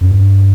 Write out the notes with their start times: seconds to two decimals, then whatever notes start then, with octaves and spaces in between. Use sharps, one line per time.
0.01 F#2
0.11 G2